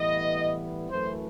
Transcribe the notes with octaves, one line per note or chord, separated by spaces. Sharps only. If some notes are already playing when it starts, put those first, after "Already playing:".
Already playing: A2 E3 G3 B3 E4 D#5
F#2 E3 A3 C5